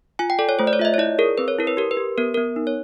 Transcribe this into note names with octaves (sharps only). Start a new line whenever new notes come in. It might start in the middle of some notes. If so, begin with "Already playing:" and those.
F4 G#5
G5
A4 D5
C#5
A3 C5
D5
C#5
F4 E5
D#5
C#5
E4 D5
G#4 A#4
C4 B4
C#5
E4 A#4
B4
G4 A#4
B4
G4
B3 A#4
B3 A#4
D#4
C#5